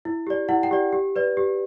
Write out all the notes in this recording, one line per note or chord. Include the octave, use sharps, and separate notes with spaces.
E4
G4 D5
E4 F#5
G5
G4 D5
G4
B4 D5
G4